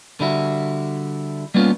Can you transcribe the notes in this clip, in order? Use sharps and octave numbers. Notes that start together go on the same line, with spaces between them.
D3 G3 E4 F#4
G3 A#3 B3 C#4 F4